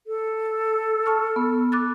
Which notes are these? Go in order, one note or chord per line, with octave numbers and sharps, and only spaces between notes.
A4
A5 C#6 F6
B3
D6 F#6 A6